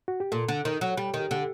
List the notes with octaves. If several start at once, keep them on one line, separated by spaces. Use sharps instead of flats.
F#4
G4
A#2 A4
D3
D#3
F#3
G3 G4
D#3
G4
D3 G4